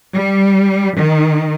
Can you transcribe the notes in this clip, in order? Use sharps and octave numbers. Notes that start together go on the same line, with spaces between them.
G3
D#3